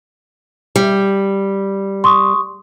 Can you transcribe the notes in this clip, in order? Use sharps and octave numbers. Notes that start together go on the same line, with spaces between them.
G3
C6 C#6 D#6